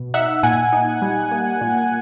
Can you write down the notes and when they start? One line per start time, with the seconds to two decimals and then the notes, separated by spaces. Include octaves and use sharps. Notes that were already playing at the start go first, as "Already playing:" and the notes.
Already playing: B2
0.14 D#4 E5 F#5
0.43 A#2 F#5 G#5
0.73 D#4
1.02 G3
1.31 A#3
1.61 A#2